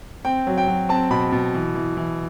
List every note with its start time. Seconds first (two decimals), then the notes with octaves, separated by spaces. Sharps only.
0.25 C4 G5
0.47 F#3
0.58 G5
0.68 F#3
0.89 C4 A5
1.11 B2 B5
1.32 B2
1.54 E3
1.75 E3
1.97 E3